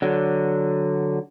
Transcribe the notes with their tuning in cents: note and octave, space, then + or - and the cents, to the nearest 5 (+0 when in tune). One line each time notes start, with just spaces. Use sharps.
D3 +0 F#3 +0